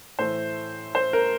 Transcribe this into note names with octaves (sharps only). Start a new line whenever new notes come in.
A2 E3 A3 C5
C5
A#4